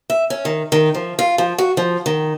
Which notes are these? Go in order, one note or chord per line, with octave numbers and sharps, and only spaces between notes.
E5
C#4
D#3
D#3
F3
F4
F3
F#4
F3
D#3